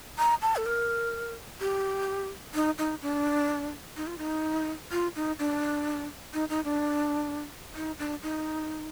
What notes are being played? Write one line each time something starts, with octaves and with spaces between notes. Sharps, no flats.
A#5
A5
A4
A#4
G4
D#4
D#4
D4
D#4
F4
D#4
F4
D#4
D4
D#4
D#4
D4
D#4
D4
D#4